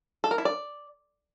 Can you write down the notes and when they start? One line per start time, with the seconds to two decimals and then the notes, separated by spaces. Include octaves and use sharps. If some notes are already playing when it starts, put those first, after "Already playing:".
0.24 A4
0.31 A#4
0.38 E4
0.45 D5